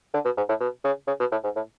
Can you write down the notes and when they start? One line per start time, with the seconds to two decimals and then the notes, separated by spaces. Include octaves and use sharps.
0.14 D3
0.25 B2
0.37 G#2
0.49 A2
0.61 B2
0.84 C#3
1.08 C#3
1.20 B2
1.32 A2
1.44 G#2
1.56 A2